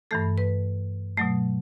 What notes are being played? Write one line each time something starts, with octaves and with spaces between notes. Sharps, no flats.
G2 E3 A3 A4
B4
B2 F#3 A3